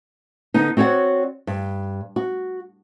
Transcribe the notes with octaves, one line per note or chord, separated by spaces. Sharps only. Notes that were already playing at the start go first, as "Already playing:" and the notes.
D3 B3 D#4
C4 F#4 C#5 D5 F#5
G2
F#4